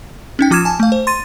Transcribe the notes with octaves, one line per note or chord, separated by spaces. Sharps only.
C#4 D#4 G5
F3 F4 D6 F6 G#6 E7
G#5 A5
A3 F5
C5
C6 A6 D#7